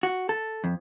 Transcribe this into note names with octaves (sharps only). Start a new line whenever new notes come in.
F#4
A4
F2